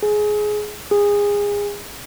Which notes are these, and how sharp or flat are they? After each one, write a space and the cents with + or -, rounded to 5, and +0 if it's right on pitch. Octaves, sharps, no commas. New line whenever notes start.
G#4 +15
G#4 -25